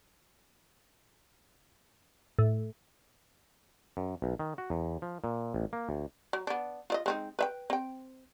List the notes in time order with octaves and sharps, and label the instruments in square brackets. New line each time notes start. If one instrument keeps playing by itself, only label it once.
[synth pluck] A2
[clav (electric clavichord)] F#2
B1
D#3
F#4
E2
F3
A#2
A1
A#3
D2
[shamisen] F#3
B3 D4
F4 D5 D#5
G#3 C4 D#4
B4 E5 G5
C4 G5